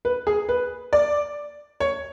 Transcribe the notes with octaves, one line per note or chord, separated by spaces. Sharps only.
B4
G#4
B4
D5
C#5